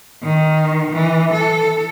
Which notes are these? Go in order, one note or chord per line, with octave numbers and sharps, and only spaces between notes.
D#3
E3
A4